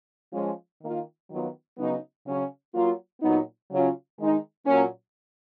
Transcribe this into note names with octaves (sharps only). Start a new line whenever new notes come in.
F3 G#3 C#4 F4
D#3 A#3 F4
D#3 F#3 B3 F4
C#3 F#3 B3 D#4
C#3 F#3 C#4
F#3 A#3 F4
A#2 F#3 B3 D#4
C#3 F#3 C#4 F4
D#3 G#3 D#4
A#2 F#3 A#3 C#4